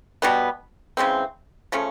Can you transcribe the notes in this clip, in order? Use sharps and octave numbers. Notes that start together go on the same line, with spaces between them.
B2 G3 B3
C#3 E3 G#3 C4
C#3 F3 A3 C#4